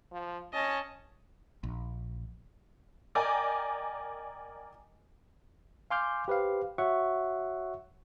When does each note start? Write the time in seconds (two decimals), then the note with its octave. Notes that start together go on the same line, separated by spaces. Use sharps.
0.12 F3
0.53 C#4 D#5 A5
1.63 A#1
3.15 A#4 D5 D#5 G5 G#5 A#5
5.90 F5 G#5 C6 D6 F6 G6
6.28 G4 B4 C5 F5
6.78 F#4 C#5 E5 F#5 C#6